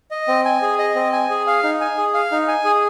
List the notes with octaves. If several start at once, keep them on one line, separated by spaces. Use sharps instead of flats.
D#5
C4
G#5
G#4
D#5
C4
G#5
G#4
F5
D#4
G#5
G#4
F5
D#4
G#5
G#4